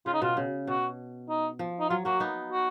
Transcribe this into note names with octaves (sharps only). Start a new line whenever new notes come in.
C#3 F4
D#4
B2 F4
C#3
B2 F#4
D#4
F3
D#4
F#3 F4
F#3 A#3 F#4
B3 D#4
F#4